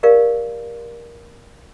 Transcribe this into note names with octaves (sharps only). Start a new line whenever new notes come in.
G4 A#4 D5 F5